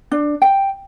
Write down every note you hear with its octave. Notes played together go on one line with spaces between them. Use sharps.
D4
G5